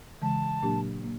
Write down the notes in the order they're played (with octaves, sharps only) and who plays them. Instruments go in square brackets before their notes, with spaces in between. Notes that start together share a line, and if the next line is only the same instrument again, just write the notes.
[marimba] C#3 E3 G#3 [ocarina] A5
[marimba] A#2 F#3 A#3 D4 G4
A#3